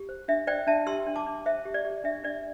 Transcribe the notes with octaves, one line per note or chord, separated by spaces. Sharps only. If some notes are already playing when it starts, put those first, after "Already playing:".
Already playing: G4
C5
D4 E5
C5 D5 G5
D4 E5 A5
G4 C6 E6
D4
A5 D6
D4
C5 E5
G4
D5
G4
D4 E5
D4 D5